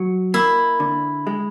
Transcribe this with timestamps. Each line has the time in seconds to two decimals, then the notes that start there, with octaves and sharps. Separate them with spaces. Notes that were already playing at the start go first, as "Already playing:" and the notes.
Already playing: F#3
0.34 A#3 E4
0.80 D3
1.27 G#3